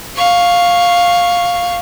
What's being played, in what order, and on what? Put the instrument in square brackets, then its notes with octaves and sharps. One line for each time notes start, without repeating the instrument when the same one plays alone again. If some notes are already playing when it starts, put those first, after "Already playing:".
[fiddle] F5 C#6